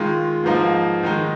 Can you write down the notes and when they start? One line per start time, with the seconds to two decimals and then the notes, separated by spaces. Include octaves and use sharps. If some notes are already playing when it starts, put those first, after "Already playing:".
Already playing: D#3 G#3 F4
0.44 G#2 F3 A#3 D#4
1.03 D#3 G#3 D#4